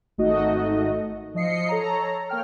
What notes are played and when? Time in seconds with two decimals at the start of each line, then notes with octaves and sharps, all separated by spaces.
0.18 G#1 A3 D#4 F#4 D#5
1.35 F3 D#5 C7 C#7
1.69 A4 C#5 A#5
2.29 A#3 C#5 G5 F6